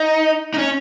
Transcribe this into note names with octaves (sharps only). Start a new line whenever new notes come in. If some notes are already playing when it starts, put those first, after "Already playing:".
Already playing: D#4
D#4
C#4